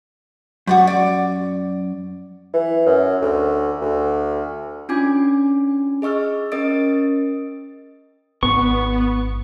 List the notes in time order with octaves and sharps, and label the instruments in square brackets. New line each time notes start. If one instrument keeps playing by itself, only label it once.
[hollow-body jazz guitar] F#2 [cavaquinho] F#4 D5 C#6
[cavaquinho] D5 D6
[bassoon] E3
F#2
D2
D2
[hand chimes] C#4 D4 F4 G#5 D6 G#6
G#4 D#5 C#6 E6 F6
C#4 A#4 D#5 D#6 A6 D7
[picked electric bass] G#1 [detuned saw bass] B3 [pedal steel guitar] C#6